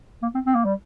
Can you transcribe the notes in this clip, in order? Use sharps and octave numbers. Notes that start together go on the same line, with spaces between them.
A#3
C4
C4
A#3
G3